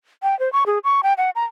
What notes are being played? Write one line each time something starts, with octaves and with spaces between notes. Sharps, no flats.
G5
C5
C#6
G#4
C#6
G5
F#5
A#5